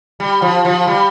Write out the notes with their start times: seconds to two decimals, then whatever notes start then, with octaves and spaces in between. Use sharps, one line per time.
0.20 G3
0.42 F3
0.65 F3
0.87 G3